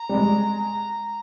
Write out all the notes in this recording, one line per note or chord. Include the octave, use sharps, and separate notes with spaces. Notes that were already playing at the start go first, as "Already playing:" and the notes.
Already playing: A#5
G3
G#3